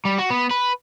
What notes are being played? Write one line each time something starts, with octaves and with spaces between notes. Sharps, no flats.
G3
F#4
B3
B4